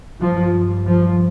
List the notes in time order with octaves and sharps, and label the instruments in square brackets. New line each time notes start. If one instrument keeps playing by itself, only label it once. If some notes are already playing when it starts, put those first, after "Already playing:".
[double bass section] G2 F3
F3